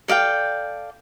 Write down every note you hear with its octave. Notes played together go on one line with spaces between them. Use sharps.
A4 D5 F5 G5